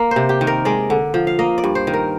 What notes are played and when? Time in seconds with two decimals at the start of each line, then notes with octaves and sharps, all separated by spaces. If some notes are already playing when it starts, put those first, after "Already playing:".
Already playing: A#3 A#4
0.11 C5
0.16 C3
0.29 G4
0.41 D#3
0.47 A#4
0.65 G#3 D5
0.90 D3
1.14 F3
1.27 F5
1.39 A#3 D#5
1.58 D5
1.64 G2
1.75 C5
1.87 D#3
1.93 A#4